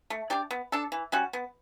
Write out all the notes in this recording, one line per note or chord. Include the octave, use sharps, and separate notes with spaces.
A3
D4 G4 D5
B3
D4 A4
E3
G3 C#4 F#4
B3